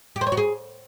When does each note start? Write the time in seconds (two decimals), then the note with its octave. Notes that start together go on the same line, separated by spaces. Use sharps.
0.16 G4
0.21 C5
0.27 C#5
0.32 F#4
0.37 G#4